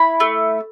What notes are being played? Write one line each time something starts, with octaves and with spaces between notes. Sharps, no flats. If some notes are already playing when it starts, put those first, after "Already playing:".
Already playing: E4 B5
A3